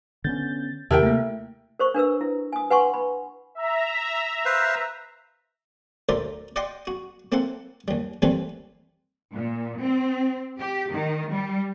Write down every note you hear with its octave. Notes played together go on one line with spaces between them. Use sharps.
D3 B3 C#4 G6 A6
D#2 C3 E4 G4 A#4 G5 A5
A3 A#3
A#4 C5 C#6
D4 A#4 B4 E6
E4
G#5 D#6
B4 F#5 G#5 C6 C#6
B5
E5 A#5
B4 C5 F5
D2 A#4 C5 D5 E5
D5 D#5 F#5 G5 C6 D6
F#4
A#3 C4 E4 A4 F#5
D#2 G3
D#2 E3 G3 A3 C4 B4
A#2
C4
G4
D#3
G3